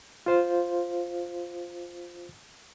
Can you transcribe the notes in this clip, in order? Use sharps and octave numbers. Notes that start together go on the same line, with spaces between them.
F4 C5 F5